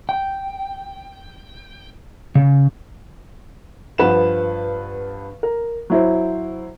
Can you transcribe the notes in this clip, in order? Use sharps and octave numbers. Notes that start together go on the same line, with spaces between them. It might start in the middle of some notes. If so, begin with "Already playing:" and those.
G5
C#3
G2 F3 B4 F#5 E7
A#4
F#3 E4 C5